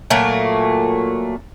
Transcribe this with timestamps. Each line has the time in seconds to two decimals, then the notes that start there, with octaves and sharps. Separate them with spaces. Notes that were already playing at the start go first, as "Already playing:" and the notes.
0.10 A#2 F#3 A3 A#3